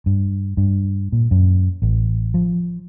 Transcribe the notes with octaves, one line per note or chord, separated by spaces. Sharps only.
G2
G2
A#2
F#2
A1
F3